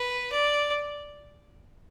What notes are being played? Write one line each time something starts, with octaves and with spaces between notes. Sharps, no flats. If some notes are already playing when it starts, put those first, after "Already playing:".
Already playing: B4
D5